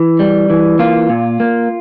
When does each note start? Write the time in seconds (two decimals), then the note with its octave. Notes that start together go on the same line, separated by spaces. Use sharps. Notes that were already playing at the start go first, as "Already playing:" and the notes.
Already playing: E3
0.19 G3
0.50 E3
0.79 A#3 F4
1.09 A#2
1.40 A#3